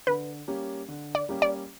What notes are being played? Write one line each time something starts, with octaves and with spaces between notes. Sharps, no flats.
D3 B4
G3 A#3 C#4 G4
D3
D5
G3 A#3 C#4 G4
D5